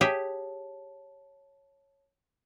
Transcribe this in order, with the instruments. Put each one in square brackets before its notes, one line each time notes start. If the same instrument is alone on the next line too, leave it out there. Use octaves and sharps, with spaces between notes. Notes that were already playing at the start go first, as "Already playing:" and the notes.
[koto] G4 G#4 E5 [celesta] C#5 A5